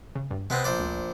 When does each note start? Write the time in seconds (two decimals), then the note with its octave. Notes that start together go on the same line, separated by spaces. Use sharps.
0.15 C#3
0.31 G2
0.50 C3 G#3 B3 C4
0.64 A#1 C5 D5
0.79 D2